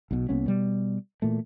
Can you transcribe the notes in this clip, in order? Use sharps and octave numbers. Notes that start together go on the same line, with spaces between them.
B1 B2
C2 A#3 B3 C#4
B2 G3
A#2 E3 A3